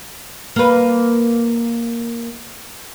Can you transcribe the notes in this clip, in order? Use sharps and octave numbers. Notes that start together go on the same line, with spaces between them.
A#3 B4